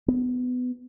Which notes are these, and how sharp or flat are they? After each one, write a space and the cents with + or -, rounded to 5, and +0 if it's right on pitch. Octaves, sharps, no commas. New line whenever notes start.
B3 +20